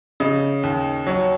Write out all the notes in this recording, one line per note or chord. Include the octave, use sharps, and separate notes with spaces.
C#3 D#5
D#2
F#3 C#5